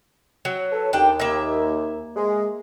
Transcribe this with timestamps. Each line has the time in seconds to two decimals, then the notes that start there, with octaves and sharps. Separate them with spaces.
0.45 F#3
0.72 A4 B4 C#5
0.93 D#2 D4 G5
1.20 A#3 E5
2.16 G#3